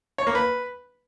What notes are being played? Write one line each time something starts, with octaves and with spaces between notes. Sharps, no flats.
C#5
A#3
B4